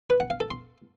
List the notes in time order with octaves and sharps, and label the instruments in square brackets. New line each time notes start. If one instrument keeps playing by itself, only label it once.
[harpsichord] B4
F#5
F5
A4
C6